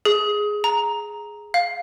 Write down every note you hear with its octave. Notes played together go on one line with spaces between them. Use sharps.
G#4
A#5
F5